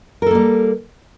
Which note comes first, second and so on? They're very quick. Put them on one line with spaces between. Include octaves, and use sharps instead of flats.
A#4 A4 A#3 G3